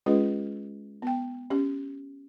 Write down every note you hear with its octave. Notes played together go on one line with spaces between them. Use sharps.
G#3 C#4 F4 G#4 B4 D#5
B3 G5
C#4 G4